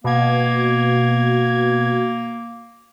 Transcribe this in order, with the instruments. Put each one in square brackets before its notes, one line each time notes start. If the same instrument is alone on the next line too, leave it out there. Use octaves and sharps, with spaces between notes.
[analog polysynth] B2 G#6 [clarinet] A#3